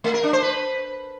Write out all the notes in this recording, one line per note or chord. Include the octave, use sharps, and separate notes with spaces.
A3
A#4
D4
C5
B4